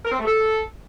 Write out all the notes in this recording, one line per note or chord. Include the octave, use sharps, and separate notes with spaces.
A#4
C4
A3
A4